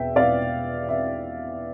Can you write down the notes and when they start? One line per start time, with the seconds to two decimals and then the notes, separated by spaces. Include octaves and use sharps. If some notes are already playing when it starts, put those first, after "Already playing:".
Already playing: E2 B2 B3 E5 G5
0.16 E2 B2 B3 D5 F5
0.88 E5